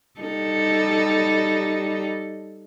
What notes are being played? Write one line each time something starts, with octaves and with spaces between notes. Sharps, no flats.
G3 D#4 A4